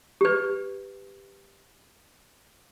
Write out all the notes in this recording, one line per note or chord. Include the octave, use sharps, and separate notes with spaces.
G4 B4